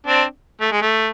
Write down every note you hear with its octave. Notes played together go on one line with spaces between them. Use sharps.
C4 D4
A3
G#3
A3